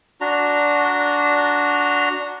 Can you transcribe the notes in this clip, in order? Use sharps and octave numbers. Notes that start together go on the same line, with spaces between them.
D4 F#4 A#5